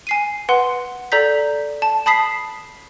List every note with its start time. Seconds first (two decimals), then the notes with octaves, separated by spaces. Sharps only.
0.07 G#5 C7 D#7
0.49 B4 F#5 C6
1.12 A4 D5 A#5 G6 B6
1.82 A5
2.06 A5 B5 D#6 B6 C7